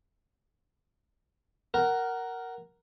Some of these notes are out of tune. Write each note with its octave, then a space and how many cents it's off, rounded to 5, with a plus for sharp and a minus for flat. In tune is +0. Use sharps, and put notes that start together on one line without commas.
A#4 +0 F#5 +15